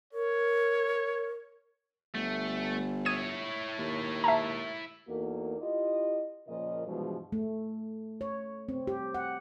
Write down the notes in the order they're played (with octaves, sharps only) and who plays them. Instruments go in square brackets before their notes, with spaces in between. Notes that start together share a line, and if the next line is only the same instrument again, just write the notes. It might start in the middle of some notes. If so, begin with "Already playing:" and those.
[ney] A#4 [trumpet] C#5
[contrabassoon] G1 [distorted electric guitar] A3
[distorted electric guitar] E4 C#5 [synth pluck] D#6 G#6 D#7
[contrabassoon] D#2
[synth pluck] E5 A5 A#5
[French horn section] E2 A#3 D#4 F#4 A4 A#4
E4 F4 G4 D#5
A#2 C#3 F3 F4 A#4 D#5
G2 B2 E3 F3 G#3 G#4
[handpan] A3
C#5
C4
G4
F#5